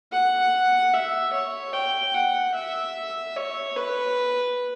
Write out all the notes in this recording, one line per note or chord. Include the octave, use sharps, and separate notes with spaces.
F#5
E5
C#5
G5
F#5
E5
C#5
B4